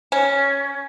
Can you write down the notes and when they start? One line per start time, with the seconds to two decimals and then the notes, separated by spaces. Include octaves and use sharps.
0.12 C#4